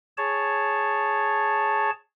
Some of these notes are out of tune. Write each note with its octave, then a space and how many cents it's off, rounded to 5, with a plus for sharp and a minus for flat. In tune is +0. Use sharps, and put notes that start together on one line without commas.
G#4 +0 C#5 +0 A5 +0